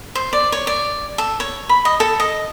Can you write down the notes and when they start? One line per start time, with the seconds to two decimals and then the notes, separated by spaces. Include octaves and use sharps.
0.15 C5
0.33 D5
0.52 C#5
0.67 D5
1.18 A4
1.40 C#5
1.69 B5
1.85 D#5
2.00 A4
2.20 D#5